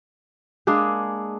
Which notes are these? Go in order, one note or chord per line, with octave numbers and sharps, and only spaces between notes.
G#3 A#3 D4 G#4